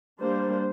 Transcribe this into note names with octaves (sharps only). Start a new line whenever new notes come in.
G3 A#3 D4 C5